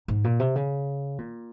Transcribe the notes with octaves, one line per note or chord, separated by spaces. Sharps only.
G#2
A#2
C3
C#3
A#2